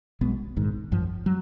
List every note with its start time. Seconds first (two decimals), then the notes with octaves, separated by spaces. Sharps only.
0.21 B1 B2 G#3 B3
0.56 A#1 G#2 D#3
0.91 G#1 F#2 F3
1.26 F#3